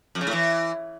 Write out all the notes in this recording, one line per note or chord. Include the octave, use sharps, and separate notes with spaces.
F2
C#3
A2
E3